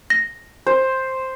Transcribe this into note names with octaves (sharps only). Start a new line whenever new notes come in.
A#6
C5